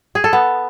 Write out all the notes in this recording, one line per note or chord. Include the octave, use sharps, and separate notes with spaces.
G#4
A4
B3